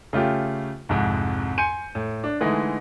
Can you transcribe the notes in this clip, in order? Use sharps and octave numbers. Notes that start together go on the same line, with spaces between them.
C#3 A3 F4 G4
C2 F2 G#2
G#5 C6 G6 C#7 D#7
A2
D4
D3 E3 G#3 A3 D#4